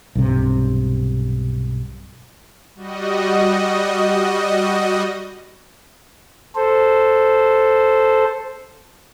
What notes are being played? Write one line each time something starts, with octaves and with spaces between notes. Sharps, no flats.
B1 G2 C3
G3 F#4 D#5
A4 C5